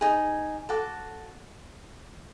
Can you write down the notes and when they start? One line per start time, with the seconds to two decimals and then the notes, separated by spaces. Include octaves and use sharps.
0.01 D#4 G#4
0.69 F#4 A4 D6